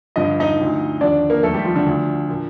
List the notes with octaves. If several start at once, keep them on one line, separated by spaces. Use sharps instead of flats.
G2 D3 F3 D#5
D#4 D#5
D2 D3 F3
D#2 D3 F3 D4 D5
A#3 A#4
F2 D#3 A3 A4
G3 G4
F3 F4
D3 D4
D2 D3 F3
A#2 F3